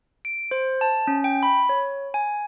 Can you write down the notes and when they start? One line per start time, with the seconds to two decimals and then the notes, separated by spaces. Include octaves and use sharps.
0.25 D7
0.51 C5
0.81 A5
1.07 C#4
1.24 G5
1.43 B5
1.69 C#5
2.14 G#5